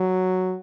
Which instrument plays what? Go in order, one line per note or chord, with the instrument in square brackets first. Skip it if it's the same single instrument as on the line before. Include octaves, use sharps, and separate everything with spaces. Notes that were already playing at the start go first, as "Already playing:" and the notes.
Already playing: [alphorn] F#3